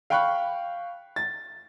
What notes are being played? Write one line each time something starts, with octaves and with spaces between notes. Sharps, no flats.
F5 G5 B5 C#6 F#6
A6